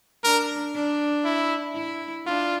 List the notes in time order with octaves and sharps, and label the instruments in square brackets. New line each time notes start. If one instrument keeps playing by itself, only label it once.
[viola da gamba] D4 [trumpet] A#4
[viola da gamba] D4
[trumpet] E4
[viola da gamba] E4
[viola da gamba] D4 [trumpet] F4